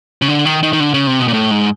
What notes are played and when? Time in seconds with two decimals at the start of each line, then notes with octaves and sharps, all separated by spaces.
0.22 C#3
0.28 D3
0.45 D#3
0.63 D#3
0.73 D#3
0.80 D3
0.94 C#3
1.07 C3
1.20 B2
1.28 A#2
1.33 A2
1.51 G#2